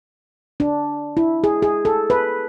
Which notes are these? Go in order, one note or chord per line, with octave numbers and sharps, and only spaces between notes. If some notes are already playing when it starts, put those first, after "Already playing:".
D4
E4
G#4
G#4
A4
B4